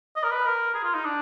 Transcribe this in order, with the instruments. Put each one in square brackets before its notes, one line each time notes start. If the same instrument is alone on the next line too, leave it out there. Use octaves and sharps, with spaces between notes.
[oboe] D#5
A#4
B4
A#4
G#4
F4
D#4
D4